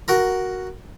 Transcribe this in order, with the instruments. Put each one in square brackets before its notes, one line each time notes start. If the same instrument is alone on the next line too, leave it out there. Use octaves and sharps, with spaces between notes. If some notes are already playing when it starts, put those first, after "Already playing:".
[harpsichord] F#4 A#4 A#5